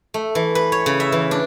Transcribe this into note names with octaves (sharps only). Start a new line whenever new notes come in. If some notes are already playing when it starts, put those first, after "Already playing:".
A3
E3
B4
C#5
C#3
E5
E3
D4